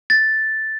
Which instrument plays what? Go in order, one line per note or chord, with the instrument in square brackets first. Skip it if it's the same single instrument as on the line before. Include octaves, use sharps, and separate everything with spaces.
[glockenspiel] A6